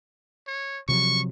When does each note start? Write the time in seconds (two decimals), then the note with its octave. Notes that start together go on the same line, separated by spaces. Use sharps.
0.47 C#5
0.88 C3 F3 F#3 C#6